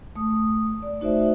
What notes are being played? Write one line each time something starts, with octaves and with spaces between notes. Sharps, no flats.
A3 D#6
D5
A3 D#4 F#4 C5 D5 E5